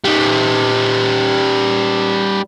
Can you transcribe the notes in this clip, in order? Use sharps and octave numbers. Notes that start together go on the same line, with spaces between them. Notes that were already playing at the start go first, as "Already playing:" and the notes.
G3 D#4